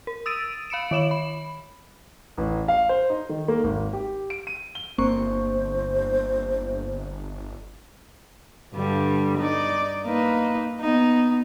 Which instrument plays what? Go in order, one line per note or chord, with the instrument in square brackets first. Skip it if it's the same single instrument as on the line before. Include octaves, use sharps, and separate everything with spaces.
[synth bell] A#4
D#6 E6 A6 D7 D#7
F5 B5 C#7 D7 E7
D#3 C#5 E7 F#7
B5
[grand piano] A1
F5
C5
D#4
D#3
A#3
G#1
G4
D7
D#7
G7
[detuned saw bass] G1 [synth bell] A#3 C4 C#6 [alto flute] C5
[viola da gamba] G2 D3 G3
D#4 D5
A#3 D#4 B4
B3 D#4